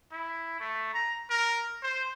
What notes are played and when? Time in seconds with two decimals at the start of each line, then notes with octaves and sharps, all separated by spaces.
0.12 E4
0.60 A3
0.94 A#5
1.30 A#4
1.83 C5